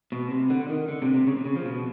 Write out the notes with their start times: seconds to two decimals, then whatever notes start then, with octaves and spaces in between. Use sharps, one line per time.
0.12 B2
0.31 C3
0.50 D3
0.69 D#3
0.89 D3
1.02 C3
1.14 C3
1.27 C#3
1.37 C3
1.45 C#3
1.56 F3
1.65 B2